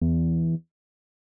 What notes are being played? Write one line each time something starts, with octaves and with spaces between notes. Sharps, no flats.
E2